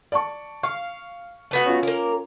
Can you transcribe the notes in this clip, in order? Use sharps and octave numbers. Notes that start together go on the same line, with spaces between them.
D5 A5 C#6
F5 C#6
A3 B3 F#4
C#4 F4
A#3 A#4